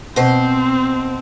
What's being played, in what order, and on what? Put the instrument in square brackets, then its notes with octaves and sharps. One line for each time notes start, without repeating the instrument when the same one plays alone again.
[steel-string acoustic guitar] B2 C5 [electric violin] C4